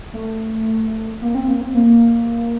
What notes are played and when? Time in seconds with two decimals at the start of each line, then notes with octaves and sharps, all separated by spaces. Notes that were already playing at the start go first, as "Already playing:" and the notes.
0.13 A3
1.22 A#3
1.35 C4
1.48 A#3
1.61 C4
1.74 A#3